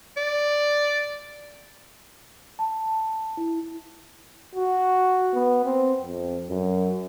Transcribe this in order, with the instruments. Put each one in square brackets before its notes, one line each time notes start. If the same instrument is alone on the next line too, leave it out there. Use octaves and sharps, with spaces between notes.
[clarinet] D5
[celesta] A5
E4
[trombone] F#4
B3
C4
F2
F#2